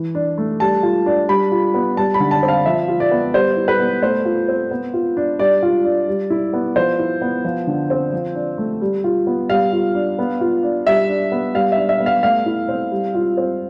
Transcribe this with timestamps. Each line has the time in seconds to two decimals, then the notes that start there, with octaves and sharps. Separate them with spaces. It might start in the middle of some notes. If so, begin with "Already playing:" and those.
Already playing: E3
0.15 D4
0.38 A3
0.60 G3 A5
0.83 F4
1.06 D4
1.29 G3 B5
1.52 F4
1.74 B3
1.97 G3 A5
2.14 B5
2.20 D3
2.31 A5
2.43 C4
2.48 F5
2.66 F3 E5
2.88 F4
3.00 D5
3.11 B3
3.34 G3 C5
3.57 E4
3.68 B4
3.80 B3
4.02 A3 C5
4.25 F4
4.48 C4
4.71 B3
4.94 F4
5.17 D4
5.39 G3 D5
5.63 F4
5.85 D4
6.08 G3
6.30 E4
6.53 B3
6.76 F3 C5
6.99 E4
7.21 B3
7.44 F3
7.67 D3
7.90 C4
8.12 F3
8.35 D4
8.58 A3
8.81 G3
9.04 F4
9.27 B3
9.49 G3 F5
9.73 F4
9.95 D4
10.19 B3
10.41 F4
10.63 D4
10.87 G3 E5
11.09 D4
11.32 B3
11.54 G3 F5
11.72 E5
11.77 D4
11.89 E5
12.00 B3
12.06 F5
12.23 A3 F5
12.46 E4
12.68 C4
12.91 G3
13.15 F4
13.37 C4